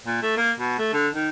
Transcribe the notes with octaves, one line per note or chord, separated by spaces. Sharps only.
A#2
A3
A#3
B2
A3
D3
D#3